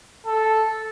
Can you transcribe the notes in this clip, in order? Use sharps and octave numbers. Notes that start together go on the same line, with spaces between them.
A4